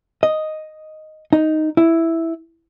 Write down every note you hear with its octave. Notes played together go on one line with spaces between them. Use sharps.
D#5
D#4
E4